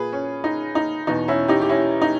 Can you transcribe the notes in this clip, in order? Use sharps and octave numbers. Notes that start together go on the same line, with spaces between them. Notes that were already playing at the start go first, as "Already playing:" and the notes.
Already playing: A#2 G#4 B4
C#4
D#4
D#4
E2 B2 D#4
C#4 E4
D#4 G4
G4
C#4 E4
D#4